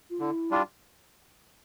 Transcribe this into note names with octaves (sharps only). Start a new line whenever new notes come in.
F4
D3 E4
G3 D4 F4